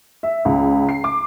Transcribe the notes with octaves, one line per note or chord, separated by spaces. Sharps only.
E5
C#2
C7
D6